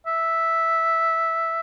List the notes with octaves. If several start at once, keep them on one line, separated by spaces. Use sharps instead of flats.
E5